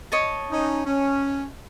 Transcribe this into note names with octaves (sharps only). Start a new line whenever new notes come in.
C#5 D#5 A5
C#4 D#4
C#4